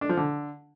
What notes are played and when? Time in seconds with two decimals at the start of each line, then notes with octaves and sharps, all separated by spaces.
0.01 D4
0.09 F3
0.17 D3